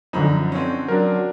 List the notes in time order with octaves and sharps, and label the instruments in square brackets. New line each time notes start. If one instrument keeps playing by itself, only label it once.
[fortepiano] F#2 B5 [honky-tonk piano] D3 F3 [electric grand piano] D#4
[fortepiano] C4 C#4
[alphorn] F#3 [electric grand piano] D4 A#4